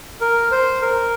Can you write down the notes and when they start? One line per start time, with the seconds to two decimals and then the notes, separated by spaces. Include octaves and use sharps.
0.21 A#4
0.51 C5
0.82 A#4